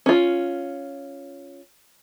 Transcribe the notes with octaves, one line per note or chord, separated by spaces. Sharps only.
C#4 F4